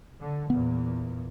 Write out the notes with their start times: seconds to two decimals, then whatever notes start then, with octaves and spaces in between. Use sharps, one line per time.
0.20 D3
0.50 E2 A#2 B3